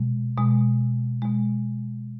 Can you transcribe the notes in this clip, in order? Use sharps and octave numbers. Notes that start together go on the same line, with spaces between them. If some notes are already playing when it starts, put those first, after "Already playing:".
Already playing: B2 G#3
B2 G#3
B2 G#3